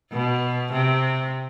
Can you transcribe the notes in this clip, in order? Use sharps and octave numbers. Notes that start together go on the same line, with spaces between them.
B2
C3